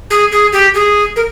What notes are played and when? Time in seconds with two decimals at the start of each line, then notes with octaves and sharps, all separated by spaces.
0.10 G#4
0.32 G#4
0.53 G4
0.74 G#4
1.16 A#4